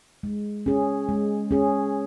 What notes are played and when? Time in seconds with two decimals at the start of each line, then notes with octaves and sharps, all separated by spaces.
0.23 G#3
0.66 C#4 G#4
1.09 G#3
1.51 C#4 G#4